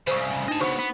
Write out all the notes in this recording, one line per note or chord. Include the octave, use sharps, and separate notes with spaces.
C2 C#3 C5 C#6
D4 D#4 D#5 A5
C#3 B3 F#4 C5 C#6
B3